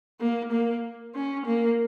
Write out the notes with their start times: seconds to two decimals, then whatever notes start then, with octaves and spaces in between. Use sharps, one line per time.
0.20 A#3
0.51 A#3
1.15 C#4
1.46 A#3